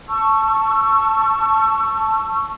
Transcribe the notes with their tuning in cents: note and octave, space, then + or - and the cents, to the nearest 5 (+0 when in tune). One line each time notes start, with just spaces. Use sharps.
A5 +0 C#6 +0 E6 +30